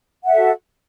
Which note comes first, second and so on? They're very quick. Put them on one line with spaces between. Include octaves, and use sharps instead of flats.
F#5 E5 A4 F#4